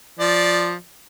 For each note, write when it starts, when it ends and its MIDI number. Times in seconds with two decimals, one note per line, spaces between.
0.20 0.73 53
0.20 0.73 74